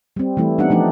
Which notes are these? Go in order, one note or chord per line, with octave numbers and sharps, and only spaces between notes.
G3 C4
E3 G3 A3 E4
G3 B3 C4 D4 D#4 F#5
F3 A3 D4 D#4